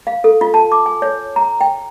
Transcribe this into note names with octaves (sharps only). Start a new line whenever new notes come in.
F5
A4
F4
A5
D6
G#5
C#5
A#5
G5